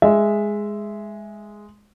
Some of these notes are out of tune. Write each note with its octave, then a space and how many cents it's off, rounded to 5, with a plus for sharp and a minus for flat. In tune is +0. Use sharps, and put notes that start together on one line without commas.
G#3 +0 E5 +0